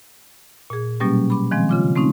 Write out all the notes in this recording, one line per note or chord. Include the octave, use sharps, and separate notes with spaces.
A#2 G#4
B2 F#3 G3 A#3 C#4 G4
B5 D6
D#3 F3 G#3 C4
C#3 F4 D6
A3 C4 C#4 D#4